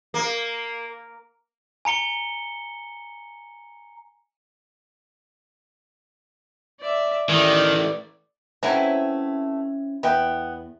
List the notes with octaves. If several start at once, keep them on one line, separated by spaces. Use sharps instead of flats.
A#3
G#5 A#5 C#7 G7
D5 E5
D#3 E3 A3 D5
E3 F#3 A3 C4 C#4 E4
E2 B3 E5 G5